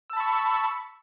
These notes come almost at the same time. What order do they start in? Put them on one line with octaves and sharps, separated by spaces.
E6 A5 B5 C#6